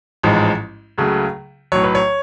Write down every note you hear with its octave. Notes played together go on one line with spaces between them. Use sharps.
A1 G#2 F3 G#3
C#2 C#3 F#3 A3
B1 A2 F#3 C#5
B4
C#5